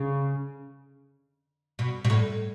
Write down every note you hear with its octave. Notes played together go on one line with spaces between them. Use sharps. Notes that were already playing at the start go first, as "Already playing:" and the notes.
Already playing: C#3
B2
B2
A2